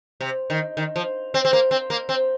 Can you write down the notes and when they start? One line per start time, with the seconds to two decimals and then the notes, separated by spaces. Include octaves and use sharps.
0.21 C3
0.50 D#3
0.77 D#3
0.96 F3
1.34 C4
1.45 C4
1.53 A#3
1.71 C4
1.90 A#3
2.09 C4